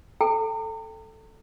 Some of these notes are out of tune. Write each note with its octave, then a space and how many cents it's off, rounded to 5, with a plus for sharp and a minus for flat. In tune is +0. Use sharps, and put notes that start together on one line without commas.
A4 +0 G5 +15 A#5 -45